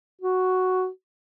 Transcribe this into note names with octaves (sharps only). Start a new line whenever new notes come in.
F#4